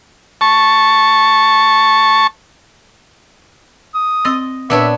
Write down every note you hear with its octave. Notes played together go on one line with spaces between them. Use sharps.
A5 C#6
D#6
C4 D#5 E6 A6
A#2 B3 D4 B4 C#5 E5